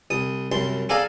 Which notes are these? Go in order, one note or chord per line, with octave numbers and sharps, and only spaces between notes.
C2 D#6
C2 F#2 C6
G#4 A4 D5 F5 G#5 A#5